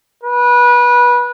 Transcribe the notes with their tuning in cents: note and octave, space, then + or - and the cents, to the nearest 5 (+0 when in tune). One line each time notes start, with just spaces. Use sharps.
B4 -25